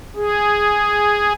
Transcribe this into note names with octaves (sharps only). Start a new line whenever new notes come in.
G#4